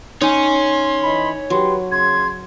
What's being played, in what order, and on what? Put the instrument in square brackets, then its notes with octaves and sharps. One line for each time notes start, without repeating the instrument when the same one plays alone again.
[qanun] D#4 [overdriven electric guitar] C#5 G#5 [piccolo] C6
[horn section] E3 D#5 B5
[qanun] F#3 [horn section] G4 B4 C6
[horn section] C#3 C6 [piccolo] G#6